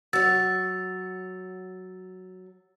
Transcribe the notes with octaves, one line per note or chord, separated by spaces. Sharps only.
F#3 C#5 E6 A6